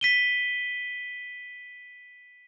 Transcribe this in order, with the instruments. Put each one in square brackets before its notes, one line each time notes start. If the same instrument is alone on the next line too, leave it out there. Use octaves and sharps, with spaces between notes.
[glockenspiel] B6 D#7 G7